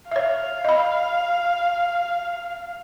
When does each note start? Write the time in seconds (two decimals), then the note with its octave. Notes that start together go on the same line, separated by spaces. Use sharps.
0.11 C#5 E5 F5
0.65 D#5 B5